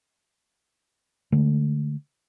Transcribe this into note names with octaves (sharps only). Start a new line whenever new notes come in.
D3 G#3 A3